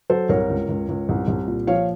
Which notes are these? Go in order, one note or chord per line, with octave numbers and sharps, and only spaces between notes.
F#3 A4 C5
C2 A#4 C#5
C#2
C#2
C#2
C2
C2
A#2
F3 C#5 F5